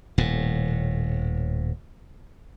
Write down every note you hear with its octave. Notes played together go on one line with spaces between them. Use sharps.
D#1 A2